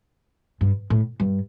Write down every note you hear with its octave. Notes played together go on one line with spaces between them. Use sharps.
G2
A2
G2